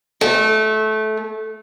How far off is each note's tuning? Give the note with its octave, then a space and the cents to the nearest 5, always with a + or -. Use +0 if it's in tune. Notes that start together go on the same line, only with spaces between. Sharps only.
A3 -20